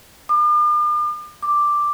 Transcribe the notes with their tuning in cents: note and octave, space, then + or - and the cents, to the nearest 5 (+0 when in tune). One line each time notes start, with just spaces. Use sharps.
D6 +45
D6 +5